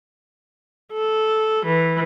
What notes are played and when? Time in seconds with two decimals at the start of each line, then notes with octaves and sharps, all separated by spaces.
0.93 A4
1.65 E3